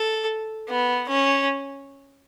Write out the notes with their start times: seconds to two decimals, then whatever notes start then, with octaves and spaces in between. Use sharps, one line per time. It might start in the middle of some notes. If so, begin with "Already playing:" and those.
Already playing: A4
0.69 B3
1.09 C#4